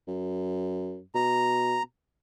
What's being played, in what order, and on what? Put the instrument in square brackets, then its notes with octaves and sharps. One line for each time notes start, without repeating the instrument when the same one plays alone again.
[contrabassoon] F#2
[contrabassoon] B2 [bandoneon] A#5